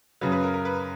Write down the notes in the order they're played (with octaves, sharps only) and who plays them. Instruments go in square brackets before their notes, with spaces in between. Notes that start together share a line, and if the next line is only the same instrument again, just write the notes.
[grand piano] F#2 C#3 F#3 B4
B4
A#4
A#4
B4